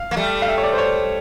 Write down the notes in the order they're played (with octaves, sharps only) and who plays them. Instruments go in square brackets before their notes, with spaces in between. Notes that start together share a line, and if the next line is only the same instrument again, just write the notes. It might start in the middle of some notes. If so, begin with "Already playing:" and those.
Already playing: [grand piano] F5
[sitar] A#3
G3 A3
[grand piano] F5
E5
C#5
D5
C5
C#5